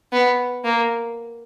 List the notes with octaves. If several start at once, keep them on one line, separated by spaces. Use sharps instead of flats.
B3
A#3